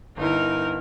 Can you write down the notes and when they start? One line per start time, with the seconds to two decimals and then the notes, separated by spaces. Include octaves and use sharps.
0.17 G1 D#4 E4 A#4